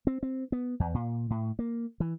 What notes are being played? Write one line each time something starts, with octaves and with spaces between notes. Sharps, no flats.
C4
C4
B3
E2
A#2
A2
A#3
E3